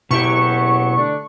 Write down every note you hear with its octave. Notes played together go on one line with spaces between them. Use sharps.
F#1 B2 F#3 E4 G4 C#6
D3 A3 D4